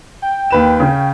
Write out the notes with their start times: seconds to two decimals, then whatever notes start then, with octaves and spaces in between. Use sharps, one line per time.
0.22 G5
0.51 D#2 B4 E7
0.80 C#3 C#4